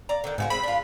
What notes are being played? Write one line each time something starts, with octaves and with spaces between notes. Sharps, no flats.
D5 A#5
D3 D#3
G#2 C#3 F#4 A#4
G#3 C4 B5
D4 F4